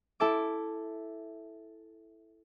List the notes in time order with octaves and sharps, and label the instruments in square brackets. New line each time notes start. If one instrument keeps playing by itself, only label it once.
[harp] E4 A4 E5 A5 D6